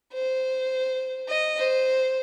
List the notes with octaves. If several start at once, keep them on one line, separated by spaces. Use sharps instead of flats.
C5
D#5
C5